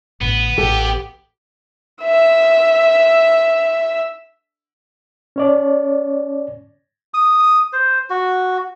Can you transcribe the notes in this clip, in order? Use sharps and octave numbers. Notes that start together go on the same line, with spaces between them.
A1 A2 D3 B3
A1 G4 A4
E5 E6
C#4 C#5 D5
D#6
C5
F#4